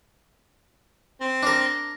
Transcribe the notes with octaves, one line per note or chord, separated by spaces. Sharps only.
C4
D4 A#4